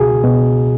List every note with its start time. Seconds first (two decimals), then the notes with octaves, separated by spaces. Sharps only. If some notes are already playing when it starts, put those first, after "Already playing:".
Already playing: C#2 B2 F#4 G#4
0.23 B2